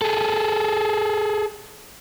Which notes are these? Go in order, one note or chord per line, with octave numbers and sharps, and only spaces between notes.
G#4 A4